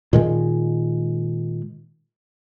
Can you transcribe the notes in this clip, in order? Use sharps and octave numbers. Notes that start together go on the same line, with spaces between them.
A#2 D#3 G#3